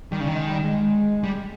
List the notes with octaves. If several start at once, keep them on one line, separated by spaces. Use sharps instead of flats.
D#3 G3
C#3
D#3
G#3
G3
G#3
G3